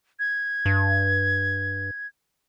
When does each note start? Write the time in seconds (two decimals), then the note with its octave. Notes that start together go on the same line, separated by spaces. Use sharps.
0.19 G#6
0.66 G2